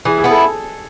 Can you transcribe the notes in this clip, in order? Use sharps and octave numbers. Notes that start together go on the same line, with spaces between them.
E3 G#4
G#4
B3 E4
A4